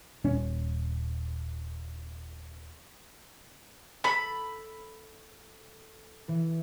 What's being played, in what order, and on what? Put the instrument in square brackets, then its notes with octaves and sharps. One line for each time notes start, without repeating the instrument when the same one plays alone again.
[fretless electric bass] D#1 C#4
[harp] A4 [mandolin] B5
[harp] E3